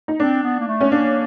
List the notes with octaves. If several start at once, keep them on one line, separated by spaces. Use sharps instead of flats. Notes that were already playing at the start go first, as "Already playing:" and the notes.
D#4
C4 D4
B3
A#3
A3
C#4
A#3 D4